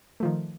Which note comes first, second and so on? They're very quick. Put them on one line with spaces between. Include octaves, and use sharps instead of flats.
A3 F3 D#3